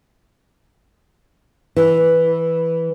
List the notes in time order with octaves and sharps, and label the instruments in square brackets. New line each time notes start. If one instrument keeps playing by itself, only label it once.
[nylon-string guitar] E3